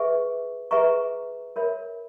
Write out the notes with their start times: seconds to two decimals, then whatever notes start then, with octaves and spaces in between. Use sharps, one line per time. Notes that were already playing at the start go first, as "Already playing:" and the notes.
Already playing: G#4 B4 E5 C#6
0.71 G#4 B4 E5 A#5 C#6
1.56 A#4 C#5 E5 B5